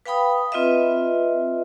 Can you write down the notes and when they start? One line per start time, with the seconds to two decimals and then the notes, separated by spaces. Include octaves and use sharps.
0.06 B4 F5 G5 B5 D#6
0.52 C4 F4 B4 D#5 E5